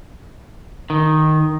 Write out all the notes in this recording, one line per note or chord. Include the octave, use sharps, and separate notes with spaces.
D#3